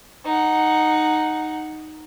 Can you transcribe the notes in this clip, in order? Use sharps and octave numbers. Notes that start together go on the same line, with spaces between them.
D#4 F#5